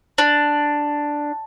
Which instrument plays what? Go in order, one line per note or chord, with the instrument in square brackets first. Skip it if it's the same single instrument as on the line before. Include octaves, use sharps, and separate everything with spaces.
[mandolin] D4